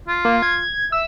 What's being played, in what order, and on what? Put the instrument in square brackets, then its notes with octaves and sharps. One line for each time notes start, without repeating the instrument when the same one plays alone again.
[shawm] F4
[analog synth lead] A#3
G#6
[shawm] E5 [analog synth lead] E6